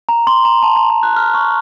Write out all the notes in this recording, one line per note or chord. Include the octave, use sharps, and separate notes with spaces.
A#5
C6
A#5
A5
A#5
C6
F#6
F6
C#6